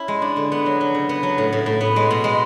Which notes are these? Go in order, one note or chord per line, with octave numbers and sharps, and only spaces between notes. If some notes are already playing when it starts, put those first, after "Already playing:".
Already playing: C#4 E4
G#3
D4
D3
B3
F#3
F#3
C#3
B3
F#3
A2
A2
A2
B3
G#3
B2
G#3